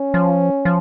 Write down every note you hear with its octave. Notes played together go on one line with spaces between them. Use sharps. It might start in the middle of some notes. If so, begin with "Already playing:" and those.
Already playing: C#4
F3
F3